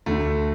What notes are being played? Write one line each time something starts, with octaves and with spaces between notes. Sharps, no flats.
D2 D3 A3